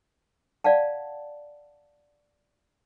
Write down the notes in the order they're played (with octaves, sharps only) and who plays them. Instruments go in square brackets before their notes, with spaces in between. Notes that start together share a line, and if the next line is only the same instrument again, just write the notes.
[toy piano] D5 F5 F#5 A5